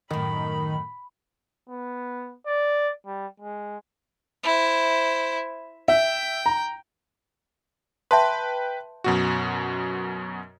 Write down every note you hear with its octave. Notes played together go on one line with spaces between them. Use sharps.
F#2 A2 D#3 B5
B3
D5
G3
G#3
E4 C5
E5 G5
A#5
B4 E5 G5 A5 C6
F#2 B2 F#4